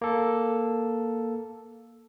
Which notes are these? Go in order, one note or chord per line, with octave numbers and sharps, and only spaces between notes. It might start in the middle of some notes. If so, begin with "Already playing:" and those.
A#3 A4